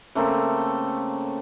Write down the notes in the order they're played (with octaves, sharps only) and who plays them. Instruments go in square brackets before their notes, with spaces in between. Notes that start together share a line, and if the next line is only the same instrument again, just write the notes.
[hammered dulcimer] C#3 A3 A#3 C4